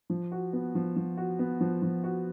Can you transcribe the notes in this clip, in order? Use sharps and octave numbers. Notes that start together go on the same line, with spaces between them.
F3
F#4
B3
F3
F3
F#4
B3
F3
F3
F#4